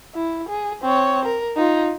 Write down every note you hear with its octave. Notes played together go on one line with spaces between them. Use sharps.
E4
G#4
C4 C#5
A#4
D#4 F4